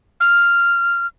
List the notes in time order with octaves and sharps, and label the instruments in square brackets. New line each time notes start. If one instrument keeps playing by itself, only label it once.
[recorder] F6